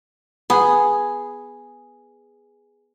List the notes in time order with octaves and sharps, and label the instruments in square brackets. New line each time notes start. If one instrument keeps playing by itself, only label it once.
[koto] B3 [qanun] G#4